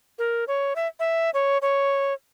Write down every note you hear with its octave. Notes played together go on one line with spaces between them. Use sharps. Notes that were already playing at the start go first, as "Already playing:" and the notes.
A#4
C#5
E5
E5
C#5
C#5